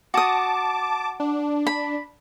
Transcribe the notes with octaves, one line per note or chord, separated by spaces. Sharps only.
F#4 A5 D6 D#6
D4
B5